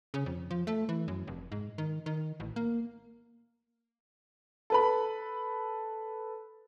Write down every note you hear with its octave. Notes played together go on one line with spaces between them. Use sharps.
C#3
F2
F3
A3
E3
F#2
F1
G#2
D#3
D#3
A1
A#3
A4 B4 B5